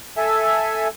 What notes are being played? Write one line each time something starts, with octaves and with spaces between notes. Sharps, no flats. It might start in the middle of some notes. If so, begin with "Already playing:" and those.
A4 E5 G#5